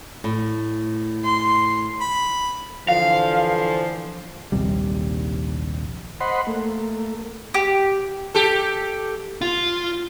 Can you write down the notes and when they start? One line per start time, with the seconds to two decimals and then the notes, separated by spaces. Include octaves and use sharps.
0.24 A2
1.24 C6
2.01 B5
2.89 D3 E3 F3 F5
4.52 A#1 D#2 C3 G3
6.21 C5 D#5 F#5 B5 C6
6.47 A3 A#3
7.54 G4
8.35 G4 A4
9.41 F4